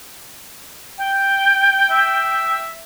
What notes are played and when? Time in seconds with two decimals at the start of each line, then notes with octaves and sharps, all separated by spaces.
0.98 G5
1.91 E5